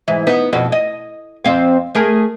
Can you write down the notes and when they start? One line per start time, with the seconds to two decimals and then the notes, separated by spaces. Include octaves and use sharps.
0.08 G#2 E3
0.27 B3 D#4
0.53 F2 B2 F#4
0.72 D#5
1.45 F2 C4 F5
1.95 A3 G#4 A#4